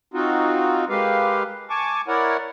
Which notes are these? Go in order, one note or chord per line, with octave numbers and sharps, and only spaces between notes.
C4 D#4 F4 F#4
G#3 A#3 G4 B4 F5
G#5 A5 C#6 D6
E4 A#4 C#5 D5 F#5